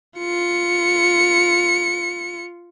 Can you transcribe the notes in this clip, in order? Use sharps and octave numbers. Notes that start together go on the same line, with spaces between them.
F4 C#7